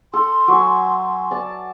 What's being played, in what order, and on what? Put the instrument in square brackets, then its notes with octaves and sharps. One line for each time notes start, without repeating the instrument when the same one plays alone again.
[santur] A4 [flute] C6
[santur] F#3 G#5
D5 A5